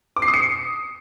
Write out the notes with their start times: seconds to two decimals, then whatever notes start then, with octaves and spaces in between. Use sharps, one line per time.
0.16 D6
0.22 C7
0.28 D#6
0.34 C#7